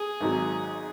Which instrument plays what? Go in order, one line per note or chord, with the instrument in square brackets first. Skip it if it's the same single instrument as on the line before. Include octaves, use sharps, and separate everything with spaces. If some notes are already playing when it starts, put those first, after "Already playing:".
Already playing: [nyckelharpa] G#4
[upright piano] G#1 G#2 F#3